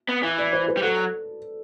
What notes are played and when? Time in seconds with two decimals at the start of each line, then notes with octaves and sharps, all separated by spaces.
0.09 B3
0.23 E3
0.38 D5
0.53 C5
0.68 B4
0.77 G3
0.82 F#3 A4